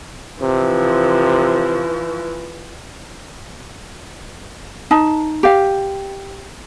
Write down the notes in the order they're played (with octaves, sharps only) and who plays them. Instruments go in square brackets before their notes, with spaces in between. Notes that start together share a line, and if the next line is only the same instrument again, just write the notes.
[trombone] C3 [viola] E3 F3
[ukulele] D#4 A5
G4 F5